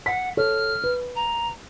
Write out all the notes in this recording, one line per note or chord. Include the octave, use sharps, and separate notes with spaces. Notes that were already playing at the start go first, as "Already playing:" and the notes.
F#5 B6
A4 C#5 F6
B4
A#5